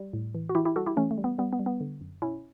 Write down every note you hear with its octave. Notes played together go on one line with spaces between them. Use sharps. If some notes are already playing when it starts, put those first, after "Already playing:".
Already playing: G3
A2
E3
F#4
E3 E4 G4
E4 G4
G3 F#4 A4
E4 G4
E3 A3 C#4
A3
G3
B3
G3 B3
B3
G3
B3
D3
F#2
B2 C#4 E4